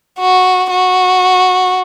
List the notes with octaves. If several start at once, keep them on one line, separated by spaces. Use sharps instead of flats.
F#4
F#4